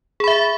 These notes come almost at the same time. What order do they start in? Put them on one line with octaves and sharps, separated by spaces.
G#4 B5 E5